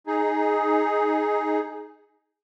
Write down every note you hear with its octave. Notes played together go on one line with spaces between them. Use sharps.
D#4 G#4